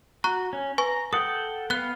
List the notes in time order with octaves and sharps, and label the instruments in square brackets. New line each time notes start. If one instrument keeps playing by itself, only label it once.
[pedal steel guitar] F#4 [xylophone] A#5 C#6 F#6
[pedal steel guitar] C#4
[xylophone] B4 G#5 C#6 [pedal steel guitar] A#5
[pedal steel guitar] A4 F#5 G5 [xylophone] D#6
[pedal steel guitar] B3 F5 [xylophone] F#6 G7